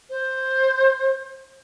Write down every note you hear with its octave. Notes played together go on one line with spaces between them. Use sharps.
C5